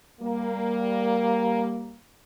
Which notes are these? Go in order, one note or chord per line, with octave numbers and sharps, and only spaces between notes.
G3 A#3